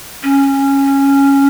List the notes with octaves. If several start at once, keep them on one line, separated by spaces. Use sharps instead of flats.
C#4